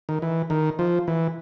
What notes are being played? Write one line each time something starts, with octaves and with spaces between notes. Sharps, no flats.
D#3
E3
D#3
F3
E3